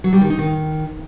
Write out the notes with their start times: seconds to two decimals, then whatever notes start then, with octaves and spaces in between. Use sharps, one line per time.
0.04 F#3
0.13 G3
0.21 D#3
0.30 D#4
0.39 D#3